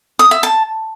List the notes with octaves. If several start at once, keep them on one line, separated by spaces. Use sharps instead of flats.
D#6
E5
A5